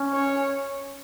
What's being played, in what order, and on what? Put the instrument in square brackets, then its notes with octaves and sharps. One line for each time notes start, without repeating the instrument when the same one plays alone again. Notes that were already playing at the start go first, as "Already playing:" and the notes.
Already playing: [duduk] C#4
[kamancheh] C#5